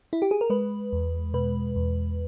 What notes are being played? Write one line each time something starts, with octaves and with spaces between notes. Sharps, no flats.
E4
G4
G#4
A#4
G#3 B4
E2
B2 B4
E2